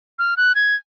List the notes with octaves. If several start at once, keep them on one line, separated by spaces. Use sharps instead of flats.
F6
F#6
G#6